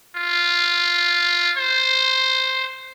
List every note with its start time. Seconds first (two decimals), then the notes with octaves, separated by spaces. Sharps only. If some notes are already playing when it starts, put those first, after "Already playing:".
0.16 F4
1.58 C5